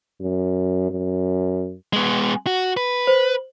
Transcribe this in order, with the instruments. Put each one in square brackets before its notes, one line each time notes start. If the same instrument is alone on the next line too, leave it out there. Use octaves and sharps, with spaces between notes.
[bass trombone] F#2
F#2
[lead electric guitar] G#3 B3
F#4
B4
[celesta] C5